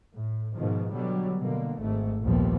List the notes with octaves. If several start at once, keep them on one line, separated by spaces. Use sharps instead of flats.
A2
G#2 B2 D#3 F3
B2 D3 F#3 G3
B2 D3 A#3
G#1 G#2 A3
A#1 D#2 A#2 F3 G3 B3